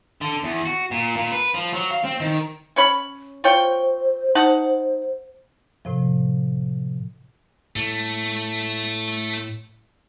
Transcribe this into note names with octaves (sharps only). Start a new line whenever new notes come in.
D3
E2
F#4
A#2
A#2
B4
F3
F#3
F5
C4
D#3
C#4 C#5 B5
F4 C5 C#5 G5
D#4 F#5 A5
A2 C3 F3
A2 A3